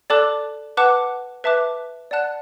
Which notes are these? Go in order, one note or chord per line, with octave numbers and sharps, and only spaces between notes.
A4 D5 A5 D6 F#6
B4 F#5 A5 D6 F#6
B4 E5 A5 D6 F#6
D5 F#5 A5 F#6